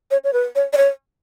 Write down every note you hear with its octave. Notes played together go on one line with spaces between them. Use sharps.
C#5
C#5
B4
C#5
D5
C#5